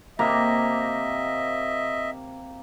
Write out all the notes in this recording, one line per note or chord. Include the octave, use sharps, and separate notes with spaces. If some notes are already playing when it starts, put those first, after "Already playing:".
C3 A#3 D#5 E5 A#5